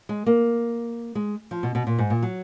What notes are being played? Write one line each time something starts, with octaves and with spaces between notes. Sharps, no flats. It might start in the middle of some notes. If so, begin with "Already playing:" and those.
G#3
A#3
G#3
F3
B2
B2
A#2
G#2
A#2
F#3